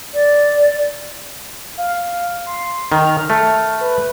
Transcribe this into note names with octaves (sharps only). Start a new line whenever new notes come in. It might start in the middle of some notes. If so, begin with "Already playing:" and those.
D5
F5
C6
D#3 F6
A3
B4